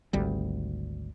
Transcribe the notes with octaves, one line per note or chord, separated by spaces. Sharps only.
G#1 D2 G3